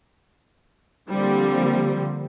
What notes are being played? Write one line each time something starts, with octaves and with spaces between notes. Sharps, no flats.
D3 F3 G3 A#3 C4